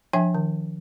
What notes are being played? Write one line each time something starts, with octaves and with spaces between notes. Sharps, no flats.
F3 D4 E5 G5 G#5
D#3